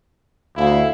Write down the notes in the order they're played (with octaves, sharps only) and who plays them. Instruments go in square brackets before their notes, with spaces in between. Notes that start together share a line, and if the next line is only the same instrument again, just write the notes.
[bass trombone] D2 [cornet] E4 [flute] F5